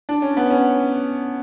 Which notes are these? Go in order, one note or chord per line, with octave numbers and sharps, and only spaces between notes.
D4
C#4
B3
C#4